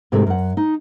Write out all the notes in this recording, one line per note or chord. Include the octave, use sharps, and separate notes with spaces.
G#2 C3 D#3 G#3 A3 E4
F#2 F#5
D#4